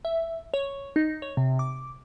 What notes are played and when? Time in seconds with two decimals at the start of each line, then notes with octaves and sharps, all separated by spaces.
0.05 E5
0.54 C#5
0.96 D#4
1.22 C#5
1.37 C3
1.59 D6